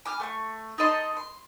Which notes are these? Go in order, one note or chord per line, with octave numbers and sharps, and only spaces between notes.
G#5 D6 F6
A3 F#5 C#6
D#4 A4 D#5 C6
C6